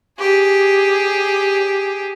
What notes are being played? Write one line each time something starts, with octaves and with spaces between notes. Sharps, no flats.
G4 G#4